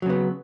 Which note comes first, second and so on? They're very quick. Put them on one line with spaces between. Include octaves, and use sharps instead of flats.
F#3 C#3 B3